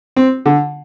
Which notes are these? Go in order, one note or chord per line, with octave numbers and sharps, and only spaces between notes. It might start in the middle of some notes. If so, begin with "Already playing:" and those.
C4
D3